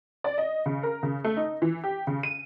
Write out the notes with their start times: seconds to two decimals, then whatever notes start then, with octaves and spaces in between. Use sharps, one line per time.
0.24 D5
0.38 D#5
0.66 C#3
0.83 A#4
1.03 C#3
1.24 A3
1.37 D#4
1.62 E3
1.84 G4
2.07 C#3
2.23 D#7